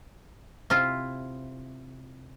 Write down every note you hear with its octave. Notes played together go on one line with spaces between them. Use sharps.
C3 E4 F4